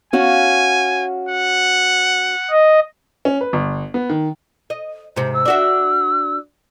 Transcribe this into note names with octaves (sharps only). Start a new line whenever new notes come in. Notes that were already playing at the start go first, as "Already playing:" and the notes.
C#4 F#4 F5 G#5
F#5
D#5
C#4
B4
G1
B3
D#3
D#5
G#2 C3 C5
E6
D4 F#4 E5